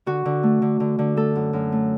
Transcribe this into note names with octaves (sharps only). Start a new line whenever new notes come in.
D3 F#4
D3
A3
D3
D3
D3
A3 A4
F#2
F#2
A3